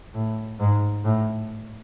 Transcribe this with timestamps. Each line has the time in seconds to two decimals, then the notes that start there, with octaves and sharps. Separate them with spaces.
0.15 A2
0.60 G#2
1.05 A2